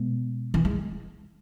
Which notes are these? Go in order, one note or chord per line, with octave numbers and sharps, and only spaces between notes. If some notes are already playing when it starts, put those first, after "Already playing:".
Already playing: B2 G#3 B3
E3
G#3